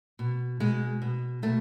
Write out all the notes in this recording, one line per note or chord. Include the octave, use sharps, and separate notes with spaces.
B2
B2 G#3
B2
B2 A3